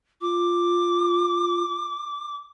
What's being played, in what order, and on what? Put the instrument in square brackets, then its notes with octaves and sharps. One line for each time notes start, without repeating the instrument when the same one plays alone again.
[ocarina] F4 [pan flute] D6